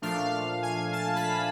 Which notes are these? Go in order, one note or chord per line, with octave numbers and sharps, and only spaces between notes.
A#2 F3 A3 D4 F5
G#5
A5
B5